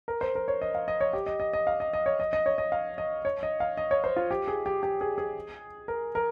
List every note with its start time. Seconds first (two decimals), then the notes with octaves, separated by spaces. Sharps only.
0.08 A#4
0.21 C5
0.35 A#4
0.48 C#5
0.62 D#5
0.75 F5
0.88 D#5
1.01 C#5
1.13 G4
1.26 D#5
1.40 D#5
1.53 D#5
1.67 F5
1.80 D#5
1.93 D#5
2.06 C#5
2.20 D#5
2.33 D#5
2.46 C#5
2.58 D#5
2.72 F5
2.98 D#5
3.25 C#5
3.43 D#5
3.60 F5
3.77 D#5
3.91 C#5
4.04 C5
4.16 F4
4.31 G4
4.48 G#4
4.66 G4
4.83 G4
5.01 G#4
5.18 G#4
5.88 A#4
6.15 A#4